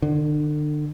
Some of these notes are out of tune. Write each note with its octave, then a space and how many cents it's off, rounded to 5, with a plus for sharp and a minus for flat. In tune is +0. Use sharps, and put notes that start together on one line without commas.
D3 +35